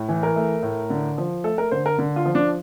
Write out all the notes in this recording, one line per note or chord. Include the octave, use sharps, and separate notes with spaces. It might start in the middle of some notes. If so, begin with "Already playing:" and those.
Already playing: A2
E3
A#4
A3
A2
D3
F3
A3 A4
A#4
D3 C5
A#4
D3
F4
F3
D4